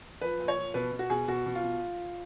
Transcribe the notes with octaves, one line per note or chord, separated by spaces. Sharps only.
F3 B4
A#2
C#5
F3
B2 B4
B2
F#4
B2 G#4
B2 F#4
B2
F4
B2